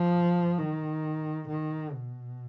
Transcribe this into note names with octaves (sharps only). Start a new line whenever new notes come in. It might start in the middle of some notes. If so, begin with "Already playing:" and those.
Already playing: F3
D#3
D#3
B2